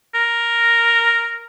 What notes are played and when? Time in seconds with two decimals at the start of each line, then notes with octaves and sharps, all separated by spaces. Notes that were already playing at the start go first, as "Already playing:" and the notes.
0.15 A#4